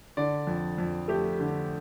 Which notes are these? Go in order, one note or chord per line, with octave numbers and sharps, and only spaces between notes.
D3 D5
F2
F2
A3 G4
D3